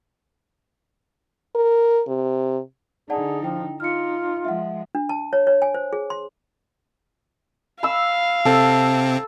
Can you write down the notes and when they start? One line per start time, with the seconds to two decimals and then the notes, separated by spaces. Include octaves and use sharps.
1.55 A#4
2.08 C3
3.10 D3 D#4 G#4 D5 F#5 A5
3.42 F3 E4 G5
3.80 D#4 F4 F6 C#7
4.45 F3 G#3 E5 F#5
4.95 D4
5.09 A5
5.33 C#5
5.47 C#5
5.62 G#5
5.74 C5
5.93 G#4
6.10 C6
7.83 F5 B5 E6
8.45 C3 C4 A4